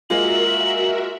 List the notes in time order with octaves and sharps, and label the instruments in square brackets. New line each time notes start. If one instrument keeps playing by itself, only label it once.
[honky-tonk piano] G#3 A#3 F4 [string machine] F#4 A#4 E5 [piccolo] F#7